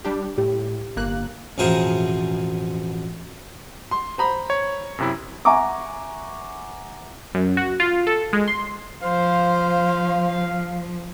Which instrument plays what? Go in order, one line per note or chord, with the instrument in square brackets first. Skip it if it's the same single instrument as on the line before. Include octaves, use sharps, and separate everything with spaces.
[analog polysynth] G3 D4 G4
[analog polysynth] A2 [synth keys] G4
[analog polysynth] G1 A#3 F#6
[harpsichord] A1 F2 B2 G#4 A#4 C5
[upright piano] C6
C5 A#5 B5
[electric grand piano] C#5
F#2 C3 E4
[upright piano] E5 F#5 G#5 A#5 C#6 D6
[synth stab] F#2
F#4
F4
A4
G#3
C6
[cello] F3 [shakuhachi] C5 [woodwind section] F5